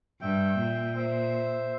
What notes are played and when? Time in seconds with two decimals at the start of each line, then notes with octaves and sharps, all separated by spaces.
0.21 G2 E5 G5
0.58 A#2
0.95 C5 E5